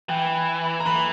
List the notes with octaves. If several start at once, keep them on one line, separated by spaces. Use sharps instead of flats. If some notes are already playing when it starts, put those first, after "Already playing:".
E3 G5
A#5
E3 B5